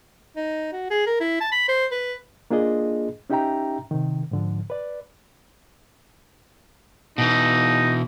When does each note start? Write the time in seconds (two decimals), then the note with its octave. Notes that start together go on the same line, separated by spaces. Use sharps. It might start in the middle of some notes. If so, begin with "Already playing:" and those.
0.36 D#4
0.72 F#4
0.90 G#4
1.07 A#4
1.20 E4
1.41 A5
1.52 B5
1.68 C5
1.91 B4
2.51 A#3 D4 F4 G#4 D#5
3.30 C#4 D#4 G4 E5 G5 A#5
3.91 C3 D#3
4.31 G#2 D3 F3
4.70 B4 D5
7.18 B2 E3 D#4